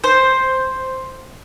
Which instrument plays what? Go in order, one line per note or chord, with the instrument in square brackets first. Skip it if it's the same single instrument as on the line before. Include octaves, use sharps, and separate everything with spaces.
[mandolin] C5